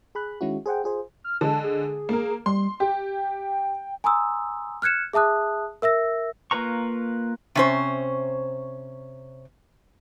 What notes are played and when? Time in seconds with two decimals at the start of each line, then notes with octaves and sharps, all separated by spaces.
0.15 G#4 B5 F#6
0.41 D#3 G#3 C#4 E4 F#4
0.66 G#4 C5 F#5 G5
0.84 F4 G#4 C5
1.24 F6
1.41 D3 G#3 A5
1.64 G#4
2.09 A#3 A#4
2.46 G3 C6
2.80 G4 G5
4.04 G#5 A#5 C6 D#6 E6
4.82 F6 F#6 G#6 C#7 E7
5.13 G#4 E5 A5 D#6 F#6
5.82 A#4 E5 E6 A#6
6.51 A#3 F4 B4 A#5 C#6
7.55 C3 C#4 C5